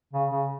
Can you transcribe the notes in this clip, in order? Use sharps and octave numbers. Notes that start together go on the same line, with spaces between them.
C#3
C#3